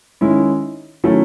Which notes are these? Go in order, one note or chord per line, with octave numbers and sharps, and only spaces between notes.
D#3 G#3 C#4 E4
D#3 F#3 A3 C#4 E4